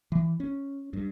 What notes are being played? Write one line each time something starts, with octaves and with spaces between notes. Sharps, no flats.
E3
C#4
G2